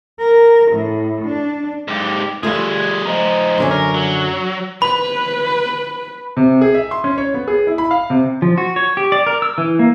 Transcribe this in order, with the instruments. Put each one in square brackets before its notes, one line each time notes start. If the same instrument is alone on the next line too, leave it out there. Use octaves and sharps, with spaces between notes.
[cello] A#4
A2
D4
[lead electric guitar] G#2 G4
[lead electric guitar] G3 G#4 [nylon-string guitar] A3 F4
[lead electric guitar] F3 D#4
[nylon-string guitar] F#2 D3 C#4
[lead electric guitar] A#4
F#3
[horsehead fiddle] B4 [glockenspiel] B5
[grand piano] C3
G#4
E5
C6
C#4
C#5
B3
G#4
E4
B5
F5
C3
[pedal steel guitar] F3
F#4
C#5
G4
D5
A#4
E6
E3
A#3